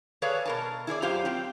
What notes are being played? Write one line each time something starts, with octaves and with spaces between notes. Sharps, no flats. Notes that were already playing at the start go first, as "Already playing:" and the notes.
G#4 A4 B4 C#5 D5 F5
B2 A#4 A5
E4 G#4 C#5 D5
F#2 F4 G4 C5 F5
C4 G5